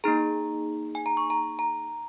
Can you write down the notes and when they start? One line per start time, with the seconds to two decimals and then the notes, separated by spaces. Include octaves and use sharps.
0.04 A#3 D#4 G#4 A#5
0.95 G#5
1.06 A#5
1.17 C#6
1.30 A#5
1.59 A#5